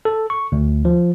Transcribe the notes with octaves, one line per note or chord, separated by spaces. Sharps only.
A4
C#6
D2
F3